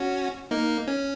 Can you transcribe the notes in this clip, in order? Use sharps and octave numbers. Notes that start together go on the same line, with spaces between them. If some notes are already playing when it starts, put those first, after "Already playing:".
Already playing: C#4 F#4
A#3 D#4
C#4